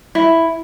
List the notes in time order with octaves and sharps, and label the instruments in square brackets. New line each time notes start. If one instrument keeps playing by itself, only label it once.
[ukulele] E4